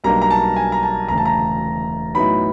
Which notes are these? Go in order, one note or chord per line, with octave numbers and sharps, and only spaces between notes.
B1 B2 G3 A#3 D4 A#5
A#5
A5
G#5
A#5
A5
E1 D2 C#3 A#5
A5
A#5
A2 F#3 B3 D#4 B5